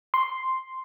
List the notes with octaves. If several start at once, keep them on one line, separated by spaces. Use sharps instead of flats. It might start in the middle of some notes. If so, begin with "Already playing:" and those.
C6